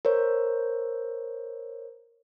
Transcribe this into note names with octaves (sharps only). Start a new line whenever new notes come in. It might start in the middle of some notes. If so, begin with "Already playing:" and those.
A#4 C5 C#5